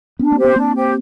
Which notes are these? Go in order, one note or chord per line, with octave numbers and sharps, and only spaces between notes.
B3 C#4 D4
A#3 C4
G4 C5
B3 C#4
A#3 C4 D4
G4 C5